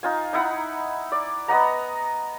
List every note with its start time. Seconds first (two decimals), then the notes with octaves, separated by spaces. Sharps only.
0.03 D#4 F4 G#5
0.33 D#4 E4 F#5 B5
1.12 D5
1.48 B3 D#5 F#5 A#5